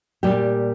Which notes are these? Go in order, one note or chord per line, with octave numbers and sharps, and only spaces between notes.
A#2 G3 G4